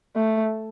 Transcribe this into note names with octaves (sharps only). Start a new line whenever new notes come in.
A3